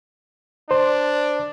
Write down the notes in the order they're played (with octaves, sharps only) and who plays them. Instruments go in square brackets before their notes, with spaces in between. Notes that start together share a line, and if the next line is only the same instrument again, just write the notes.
[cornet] D4 [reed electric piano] C5